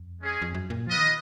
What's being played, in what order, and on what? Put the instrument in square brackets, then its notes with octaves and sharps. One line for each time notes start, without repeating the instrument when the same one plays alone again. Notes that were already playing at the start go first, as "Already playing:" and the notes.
Already playing: [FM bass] F2
[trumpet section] G#3 C#4 G#4
[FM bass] F2
F#2
A#2
[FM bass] F3 [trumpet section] F4 B4 D#5
[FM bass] D#3